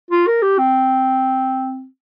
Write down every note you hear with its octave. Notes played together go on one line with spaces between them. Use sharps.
F4
A#4
G4
C4